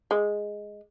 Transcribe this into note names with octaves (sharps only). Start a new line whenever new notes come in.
G#3